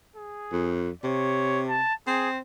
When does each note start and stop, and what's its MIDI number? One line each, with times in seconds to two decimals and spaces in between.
0.16 0.77 68
0.52 0.90 41
1.04 1.83 48
1.04 1.63 73
1.68 1.94 81
2.07 2.39 60
2.07 2.29 68